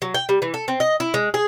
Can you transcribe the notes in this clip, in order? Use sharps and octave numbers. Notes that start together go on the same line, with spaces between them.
F#3
G5
G3
E3
A4
C4
D#5
E4
G#3
G#4